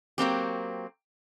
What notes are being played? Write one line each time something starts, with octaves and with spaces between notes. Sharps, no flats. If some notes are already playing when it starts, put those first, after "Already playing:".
F#3 A#3 C4 G4